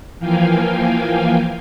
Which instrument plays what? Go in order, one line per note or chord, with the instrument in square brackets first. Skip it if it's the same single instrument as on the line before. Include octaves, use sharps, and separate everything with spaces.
[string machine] E3 F3 A#3 F5 G5 G#5